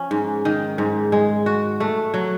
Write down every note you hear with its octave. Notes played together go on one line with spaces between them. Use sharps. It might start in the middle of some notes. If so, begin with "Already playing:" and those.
Already playing: F3 C#4
G#2
D#3
G#2
G#3
F#4
A3
F#3